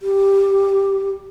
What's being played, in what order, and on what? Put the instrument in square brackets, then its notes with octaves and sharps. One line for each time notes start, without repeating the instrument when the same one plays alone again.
[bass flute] G4